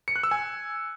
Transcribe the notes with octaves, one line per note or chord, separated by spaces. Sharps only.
C#7
F#6
E6
G#5